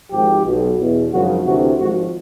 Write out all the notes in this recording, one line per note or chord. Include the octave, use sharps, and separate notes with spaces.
G#1 G#2 F3 G4
B1 B2
E2 B2
G#1 F#2 C#3 F3 F#4
D2 C3 E3 F#4
G#1 G#2 F3 F#4